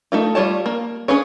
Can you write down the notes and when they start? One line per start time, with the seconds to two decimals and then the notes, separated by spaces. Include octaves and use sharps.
0.12 A3 D#4 F4
0.35 G3 F4 C#5 A5
0.66 A#3
1.08 C#4 G#4 B4 C#5